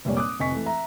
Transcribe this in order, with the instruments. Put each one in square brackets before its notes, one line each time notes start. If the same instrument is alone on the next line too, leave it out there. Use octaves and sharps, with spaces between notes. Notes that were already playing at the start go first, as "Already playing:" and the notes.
[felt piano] F1 A#1 A#2 G3 C#5
D6 D#6 F#6
F1 C3 D#5 G#5 C#6 B6
E3 A3
E5 A#5